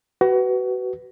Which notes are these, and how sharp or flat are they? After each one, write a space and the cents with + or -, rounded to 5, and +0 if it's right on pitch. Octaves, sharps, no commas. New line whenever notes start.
F#4 +30 B4 +10